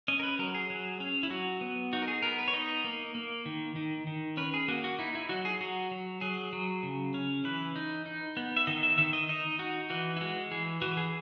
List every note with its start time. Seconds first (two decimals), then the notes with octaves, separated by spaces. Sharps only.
0.08 C#4 D#5
0.19 A#4
0.23 B4
0.39 F#3 A#4
0.55 G#4
0.70 F#3
1.00 C#4
1.23 E4
1.30 F#3 F#4
1.61 B3
1.93 D#4 F#4
2.02 A#4
2.08 G#4
2.22 B3 A#4
2.38 B4
2.48 C#5
2.53 D#4 D#5
2.84 A#3
3.15 A#3
3.46 D#3
3.76 D#3
4.07 D#3
4.37 C#4 B4
4.54 G#4
4.68 A#3 F#4
4.84 F#4
4.99 D#4 E4
5.15 E4
5.29 F#3 F#4
5.45 G#4
5.61 F#3 F#4
5.91 F#3
6.21 F#3 G#4
6.53 F#3
6.83 C#3
7.14 C#4
7.44 E3 B4
7.76 D#4
8.06 D#4
8.37 B3
8.56 E5
8.67 D#3 D#5
8.83 E5
8.98 D#3 E5
9.13 D#5
9.29 D#4 D#5
9.59 D#4 F#4
9.90 E3 F#4
10.17 E4
10.21 G#3 F#4
10.51 E3 G#4
10.82 E3 F#4
10.97 G#4